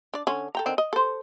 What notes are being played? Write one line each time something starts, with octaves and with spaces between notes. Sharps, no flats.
D4 D5
D3 C#4
A4 G5 A#5
D3 D#3 C4
D#5
A4 C5